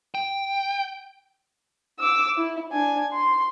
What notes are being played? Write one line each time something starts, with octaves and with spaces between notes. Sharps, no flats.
G5
D6 E6
E4
D4 G#5
C6